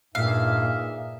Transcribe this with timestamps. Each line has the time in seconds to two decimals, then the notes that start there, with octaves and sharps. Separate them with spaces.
0.15 G2 A#2 D#4 G#4 E5 F5